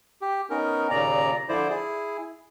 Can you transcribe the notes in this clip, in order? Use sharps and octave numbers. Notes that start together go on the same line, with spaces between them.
G4
B3 C#4 D#4 A#4
D#2 A#2 C#3 D5 A#5
D3 F3 E4 C5 D5
E4 G#4